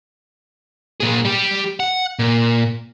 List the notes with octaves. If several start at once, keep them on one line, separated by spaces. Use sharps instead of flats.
A#2 G#4
G3 G4
F#5
A#2